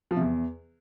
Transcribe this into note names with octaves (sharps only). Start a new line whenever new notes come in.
F3
C3
E2